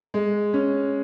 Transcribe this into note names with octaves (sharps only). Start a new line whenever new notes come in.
G#3
C#4